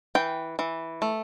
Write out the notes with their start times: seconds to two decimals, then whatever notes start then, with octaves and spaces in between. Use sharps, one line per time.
0.15 E3 G5
0.59 E3
1.02 A3